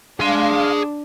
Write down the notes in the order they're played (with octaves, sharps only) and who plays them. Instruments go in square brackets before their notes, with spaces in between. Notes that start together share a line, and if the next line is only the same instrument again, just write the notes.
[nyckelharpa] D4 [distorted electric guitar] G#4 C6 [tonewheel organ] F5